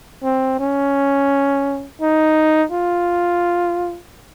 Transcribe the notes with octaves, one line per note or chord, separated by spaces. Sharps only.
C4
C#4
D#4
F4